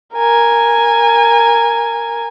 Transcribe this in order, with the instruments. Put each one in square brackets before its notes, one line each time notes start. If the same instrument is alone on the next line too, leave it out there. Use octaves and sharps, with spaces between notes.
[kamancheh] A#4 G#5